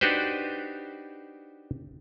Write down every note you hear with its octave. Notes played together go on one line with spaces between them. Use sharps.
D4 D#4 F#4 G4 B4 C5